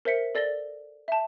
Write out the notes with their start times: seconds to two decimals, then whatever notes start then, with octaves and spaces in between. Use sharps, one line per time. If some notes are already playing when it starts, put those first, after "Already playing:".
0.05 A#4 C5 E5 B6 C#7
0.35 A4 D5 A6 A#6 G7
1.08 E5 A5